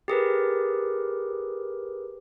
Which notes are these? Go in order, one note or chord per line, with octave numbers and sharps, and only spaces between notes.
G4 G#4 A#4 B4